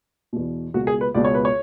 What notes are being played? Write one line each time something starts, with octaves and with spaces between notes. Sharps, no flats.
E2 B2
C#2 B2 F#4
G#4
B4
C#2 B2 D5
C#5
B4
C#5